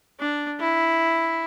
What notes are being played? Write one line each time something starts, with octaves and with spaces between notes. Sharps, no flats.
D4
E4